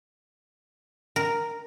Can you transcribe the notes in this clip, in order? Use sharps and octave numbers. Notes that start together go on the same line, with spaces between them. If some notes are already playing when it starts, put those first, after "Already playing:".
A#4